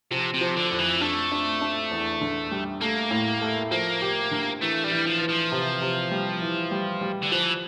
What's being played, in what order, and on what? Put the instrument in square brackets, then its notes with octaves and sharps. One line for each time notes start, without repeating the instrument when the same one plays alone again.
[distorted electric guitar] C3 [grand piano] F3
[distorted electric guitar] C3
[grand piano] F3
[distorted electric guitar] D3
[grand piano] F2
[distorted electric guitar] E3
[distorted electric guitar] A3 [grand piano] D4
[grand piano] D4
D4
E2
D3
G3
[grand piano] A3 [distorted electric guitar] A#3
[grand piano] A2
A3
[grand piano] F3 [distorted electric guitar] A#3
[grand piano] G4
D3
[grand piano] E3 [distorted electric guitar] A3
[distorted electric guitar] G3
[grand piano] E3
[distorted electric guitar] F3
[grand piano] E3
[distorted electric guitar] F3
[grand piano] C3
C3
G3
E3
G3
G3
[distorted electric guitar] D3
[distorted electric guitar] E3 [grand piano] F3